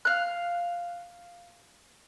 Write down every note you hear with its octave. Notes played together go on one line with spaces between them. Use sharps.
F5 F#6